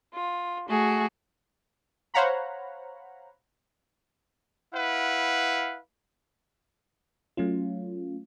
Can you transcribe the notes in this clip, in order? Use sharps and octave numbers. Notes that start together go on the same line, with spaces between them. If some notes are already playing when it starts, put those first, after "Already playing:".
F4
A3 F#4 G#4
C5 C#5 F5 F#5 A#5 B5
E4 B4 F5 F#5
F#3 A3 C#4 F4